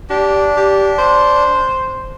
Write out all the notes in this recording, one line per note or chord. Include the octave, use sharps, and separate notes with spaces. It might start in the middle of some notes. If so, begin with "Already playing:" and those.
D4 G4
G4
C5